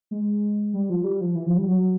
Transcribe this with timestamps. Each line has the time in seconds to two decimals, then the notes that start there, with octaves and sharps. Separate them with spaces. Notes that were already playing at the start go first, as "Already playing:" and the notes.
0.11 G#3
0.73 G3
0.90 F3
1.04 G3
1.21 F3
1.35 E3
1.46 F3
1.56 G3
1.67 F#3